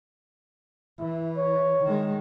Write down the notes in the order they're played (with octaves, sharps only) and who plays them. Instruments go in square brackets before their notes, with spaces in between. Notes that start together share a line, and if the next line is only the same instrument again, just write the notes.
[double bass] E3 [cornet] E4
[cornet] C#5
[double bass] D#3 G#3